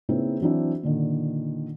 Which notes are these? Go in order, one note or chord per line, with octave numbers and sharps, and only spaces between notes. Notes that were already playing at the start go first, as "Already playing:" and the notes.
C#3 A#3 C4 D#4 E4 B4
E3 F#3 C4 D4 E4
A#2 D3 D#3